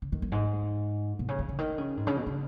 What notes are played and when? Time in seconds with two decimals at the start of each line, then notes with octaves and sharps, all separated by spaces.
0.02 C#3
0.12 D#3
0.22 F#2
0.32 G#2
1.19 B2
1.29 C#3
1.39 D#3
1.49 C#3
1.59 D#3
1.78 C#3
1.97 G#2
2.07 C#3
2.16 B2
2.27 C#3